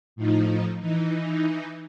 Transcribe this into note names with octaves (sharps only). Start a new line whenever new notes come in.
A2 F3 D#4
E3 D#4